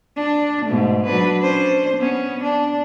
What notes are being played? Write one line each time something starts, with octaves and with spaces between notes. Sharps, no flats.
D4
G#2 B2 A3
F#3 D4 B4
C#4 D4 C5
B3 C#4
D4